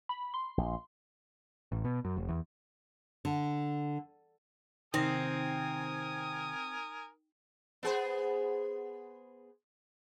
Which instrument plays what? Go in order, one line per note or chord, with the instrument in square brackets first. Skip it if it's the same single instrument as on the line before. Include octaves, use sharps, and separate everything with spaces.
[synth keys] B5
C6
[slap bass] A#1
[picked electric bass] A1
B2
F#2
F1
E2
[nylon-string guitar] D3
[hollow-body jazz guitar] C3 D#3 [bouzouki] C4 [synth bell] D#4 [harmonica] A#4 G#5 D#6
[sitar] B3 G#4 C5